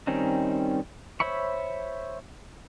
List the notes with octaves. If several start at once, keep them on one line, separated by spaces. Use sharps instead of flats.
D#3 G3 C4 C#4 D#4
C5 C#5 E5 B5 C#6